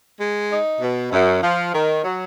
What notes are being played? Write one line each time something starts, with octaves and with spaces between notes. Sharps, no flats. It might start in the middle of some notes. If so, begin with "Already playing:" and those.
G#3
D#4
B2
F#2
F3
D#3
F#3